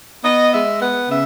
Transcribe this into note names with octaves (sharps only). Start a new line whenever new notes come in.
B3 D#5
G#3 E5
B3 F#5
C#3 E5